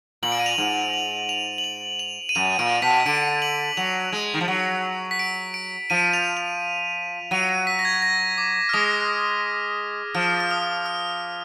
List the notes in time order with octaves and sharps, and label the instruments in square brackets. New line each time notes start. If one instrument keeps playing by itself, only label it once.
[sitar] A#2 [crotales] F#7
[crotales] D7
D#7
F7
[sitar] G#2
[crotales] F#7
F7
F#7
F7
F7
D#7
[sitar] F#2 [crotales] F7
[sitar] A#2 [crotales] D7
[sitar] B2 [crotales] B6
[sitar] D3 [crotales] D7
[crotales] F#7
[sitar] F#3 [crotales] F7
[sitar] G#3
D#3
F3
F#3
[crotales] B6
D7
D7
[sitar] F3 [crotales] D#7
[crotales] F7
F7
[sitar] F#3 [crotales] D#7
[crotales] D#7
B6
A#6
G#6
A#6
D6
F6
[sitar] G#3 [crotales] D#6
[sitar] F3 [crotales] F6
[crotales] F6
D#6
F6